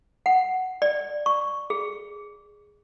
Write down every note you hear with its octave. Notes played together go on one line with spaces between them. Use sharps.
F#5
D5
C#6
G#4